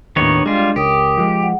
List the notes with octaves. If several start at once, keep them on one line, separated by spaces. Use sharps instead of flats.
D#2 A2 D#3 B3 D4 C#5
G3 G#3 F4
C#2 G4 A#4 D#6
F3 G#3
F#5